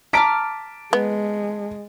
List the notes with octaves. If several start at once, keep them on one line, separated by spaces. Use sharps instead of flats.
A5 A#5 D6 F6 B6 D7
G#3 B3